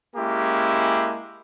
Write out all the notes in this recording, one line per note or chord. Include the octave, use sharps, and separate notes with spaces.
G#3 A#3 C#4 E4 G4